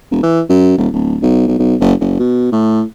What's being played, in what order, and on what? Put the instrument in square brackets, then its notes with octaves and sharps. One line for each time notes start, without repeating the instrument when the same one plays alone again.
[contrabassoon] E1
E3
F#2
D#1
D1
B1
B1
B1
F#1
F#1
B2
A2